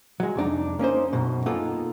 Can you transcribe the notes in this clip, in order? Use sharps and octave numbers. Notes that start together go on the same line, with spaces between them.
F#3 G#3
C2 F2 D4 D#4
A#3 C#4 D#4 C5
B1 F#2 B2
A#3 B3 D#4 F4 G#4 A4